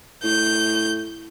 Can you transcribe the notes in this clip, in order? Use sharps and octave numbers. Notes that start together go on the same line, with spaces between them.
A2 G6